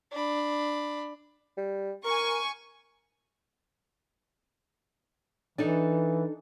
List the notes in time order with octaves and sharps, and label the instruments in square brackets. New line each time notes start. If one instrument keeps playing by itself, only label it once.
[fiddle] D4 B5
[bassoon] G3
[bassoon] A#4 [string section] G#5 C#6
[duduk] E3 [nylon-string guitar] D4 D#4 A4